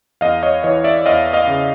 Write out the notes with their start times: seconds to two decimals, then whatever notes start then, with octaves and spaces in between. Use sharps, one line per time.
0.21 E2 D#5 F5
0.43 C#5 D#5
0.63 E3 C#5 D#5
0.84 D5 E5
1.06 E2 D#5 F5
1.33 D#5 F5
1.47 C#3